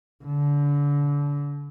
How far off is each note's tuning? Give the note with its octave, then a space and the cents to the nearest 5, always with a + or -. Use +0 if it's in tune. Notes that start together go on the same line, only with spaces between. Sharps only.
D3 -30